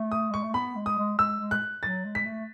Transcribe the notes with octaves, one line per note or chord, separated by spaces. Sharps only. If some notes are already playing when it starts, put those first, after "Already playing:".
Already playing: A3
D#6
G#3 C#6
A3
B3 B5
G#3
D#6
G#3
G#3 E6
G#3
F#6
F#3 A6
G#3
B6
A3